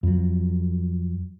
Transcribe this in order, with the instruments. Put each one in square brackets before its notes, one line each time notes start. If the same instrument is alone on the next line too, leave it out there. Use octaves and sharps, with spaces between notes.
[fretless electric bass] F2 F#3